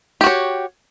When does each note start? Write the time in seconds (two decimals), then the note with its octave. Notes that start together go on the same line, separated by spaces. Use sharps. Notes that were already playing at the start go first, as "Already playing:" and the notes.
0.21 G4
0.24 F#4
0.26 C#5